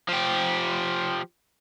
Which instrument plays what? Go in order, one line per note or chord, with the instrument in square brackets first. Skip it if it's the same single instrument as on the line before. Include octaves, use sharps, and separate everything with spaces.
[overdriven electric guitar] F3 G4